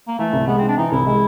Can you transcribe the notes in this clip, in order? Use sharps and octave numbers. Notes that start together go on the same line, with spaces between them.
A#3
E3 A3
C2
G#3 B3
C4
C3
D4
E3 D#4
C2 E4
G#3 E4